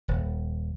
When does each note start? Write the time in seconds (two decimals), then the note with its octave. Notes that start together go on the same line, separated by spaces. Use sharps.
0.08 D#1